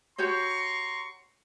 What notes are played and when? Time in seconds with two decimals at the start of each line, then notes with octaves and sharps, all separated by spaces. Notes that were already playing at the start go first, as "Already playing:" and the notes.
0.18 F#4 G4 C#5 A#5 C6 C#6